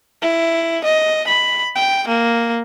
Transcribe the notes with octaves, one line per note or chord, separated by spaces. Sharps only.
E4
D#5
B5
G5
A#3